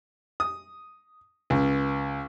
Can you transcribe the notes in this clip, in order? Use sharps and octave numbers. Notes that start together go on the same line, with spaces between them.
D#6
C#2